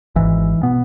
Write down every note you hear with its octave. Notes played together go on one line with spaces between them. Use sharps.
G#1 G#2 E3
B2 B3